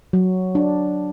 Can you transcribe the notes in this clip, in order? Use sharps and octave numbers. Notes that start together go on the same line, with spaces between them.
F#3
D4